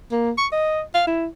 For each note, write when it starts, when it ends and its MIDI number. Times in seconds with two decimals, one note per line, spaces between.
0.12 0.31 58
0.38 0.47 85
0.52 0.81 75
0.94 1.03 77
1.07 1.27 64